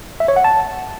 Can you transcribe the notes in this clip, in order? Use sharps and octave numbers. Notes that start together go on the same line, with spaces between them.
E5
C#5
F#5
A5